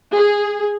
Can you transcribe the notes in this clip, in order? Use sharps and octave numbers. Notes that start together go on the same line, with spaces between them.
G#4